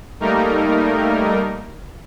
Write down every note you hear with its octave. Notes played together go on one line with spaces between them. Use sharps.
G3 A3 A#3 D#4 A#4